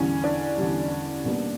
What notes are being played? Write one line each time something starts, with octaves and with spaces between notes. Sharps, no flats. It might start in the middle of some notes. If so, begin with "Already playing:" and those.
Already playing: E2 D3 G3 C#4
D4
E2 D3 G3
B2 G3 A#3